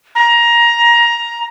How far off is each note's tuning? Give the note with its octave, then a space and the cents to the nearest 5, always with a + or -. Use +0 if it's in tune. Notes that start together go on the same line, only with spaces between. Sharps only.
A#5 +15